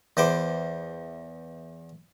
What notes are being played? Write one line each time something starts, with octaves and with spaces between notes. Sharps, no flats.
E2 B4 C5 D6